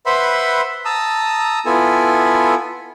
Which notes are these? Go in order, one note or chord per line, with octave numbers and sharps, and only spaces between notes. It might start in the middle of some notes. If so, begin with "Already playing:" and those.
B4 C5 E5 F#5 B5 C6
A5 A#5 D#6 E6
B3 E4 F4 A4 G#5